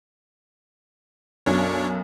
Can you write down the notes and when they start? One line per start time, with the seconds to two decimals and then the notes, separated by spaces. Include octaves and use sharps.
1.46 B1 F#2 D4 C#5